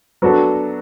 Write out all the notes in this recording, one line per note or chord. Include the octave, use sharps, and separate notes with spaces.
F#3 B3 D4 F#4 A4